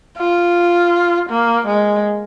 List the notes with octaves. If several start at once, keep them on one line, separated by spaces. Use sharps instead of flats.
F4
A#3
G#3